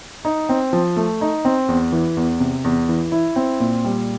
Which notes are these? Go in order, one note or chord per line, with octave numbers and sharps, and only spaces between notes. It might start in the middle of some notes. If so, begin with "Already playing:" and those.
D#4
C4
F3
A3
D#4
C4
E2
E3
E2
C3
E2
E3
E4
C4
A#2
G3